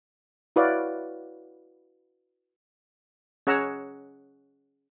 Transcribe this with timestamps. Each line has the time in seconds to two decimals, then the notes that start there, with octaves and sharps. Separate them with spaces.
0.56 E4 F#4 B4 C#5 D5 F5
3.47 C#4 G#4 C#5 F#5 A#5 E6